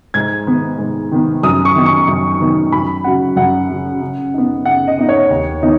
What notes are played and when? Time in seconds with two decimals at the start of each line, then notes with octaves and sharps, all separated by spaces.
0.14 G#2 G#6
0.47 D#3 B3
0.79 G#2
1.12 D#3 B3
1.43 F#2 D#6
1.65 C#6
1.76 D#3 B3 D#4
1.86 C#6
2.08 F#2
2.40 D#3 B3 D#4
2.72 F#2 B5
3.04 C#3 F#3 F#5
3.36 F#2 F#5
3.69 C#3 F#3
4.01 C#3
4.34 B3 D#4
4.65 C#3 F#5
4.88 D#5
4.98 B3 D#4
5.09 C#5
5.30 D#2
5.62 D#3 B3 D#4